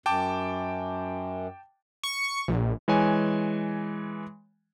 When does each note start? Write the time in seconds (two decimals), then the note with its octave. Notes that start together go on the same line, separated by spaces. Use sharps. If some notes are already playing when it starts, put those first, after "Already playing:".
0.06 F#2 G5 A5 D6
2.03 C#6
2.48 A#1
2.88 E3 G#3 C#5 G#5